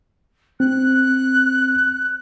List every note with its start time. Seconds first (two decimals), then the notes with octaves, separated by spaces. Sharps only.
0.60 C4 F#6